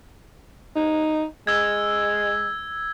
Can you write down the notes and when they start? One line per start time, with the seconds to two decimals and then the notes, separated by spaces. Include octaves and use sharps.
0.76 D#4
1.47 G#3 E6 G#6